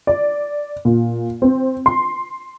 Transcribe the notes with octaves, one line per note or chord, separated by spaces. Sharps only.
D5
A#2
C4
C6